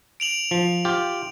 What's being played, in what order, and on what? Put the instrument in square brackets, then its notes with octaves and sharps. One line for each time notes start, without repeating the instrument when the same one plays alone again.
[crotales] D7 F7 F#7
[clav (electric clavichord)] F3
F4 G4